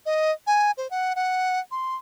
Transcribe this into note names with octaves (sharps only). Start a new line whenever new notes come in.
D#5
G#5
C5
F#5
F#5
C6